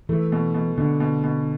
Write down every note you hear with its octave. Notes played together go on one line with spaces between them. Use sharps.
E3 A3
B2
B2
B2 D3
B2
B2